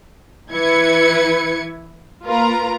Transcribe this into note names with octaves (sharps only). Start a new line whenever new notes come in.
E3 E4 B4 G#6 C#7
A#3 F4 A#4 B4 A#5